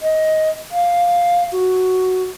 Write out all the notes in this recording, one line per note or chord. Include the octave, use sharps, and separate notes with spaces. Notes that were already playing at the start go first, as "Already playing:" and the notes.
D#5
F5
F#4